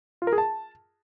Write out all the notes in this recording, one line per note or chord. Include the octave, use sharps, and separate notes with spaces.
F4
A#4
G#4
A5